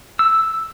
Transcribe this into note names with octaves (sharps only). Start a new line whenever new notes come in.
E6